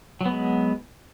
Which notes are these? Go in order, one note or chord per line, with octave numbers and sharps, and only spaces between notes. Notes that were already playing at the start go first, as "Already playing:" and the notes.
F#3 G#3 B3